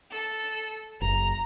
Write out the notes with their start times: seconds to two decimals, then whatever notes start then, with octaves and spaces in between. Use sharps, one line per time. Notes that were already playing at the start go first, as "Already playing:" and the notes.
0.11 A4
1.01 F#1 A#5